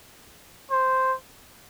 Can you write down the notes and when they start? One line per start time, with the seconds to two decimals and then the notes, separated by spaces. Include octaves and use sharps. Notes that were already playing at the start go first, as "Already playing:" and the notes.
0.71 C5